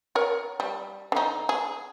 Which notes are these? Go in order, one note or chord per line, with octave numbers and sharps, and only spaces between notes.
A#4 C#5
G3
D3 D#4
G#4